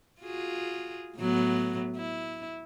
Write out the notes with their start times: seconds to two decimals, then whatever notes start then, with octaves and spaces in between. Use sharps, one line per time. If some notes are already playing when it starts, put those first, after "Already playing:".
0.22 F4 F#4 G#4
1.18 A2 F#3 B3
1.96 E4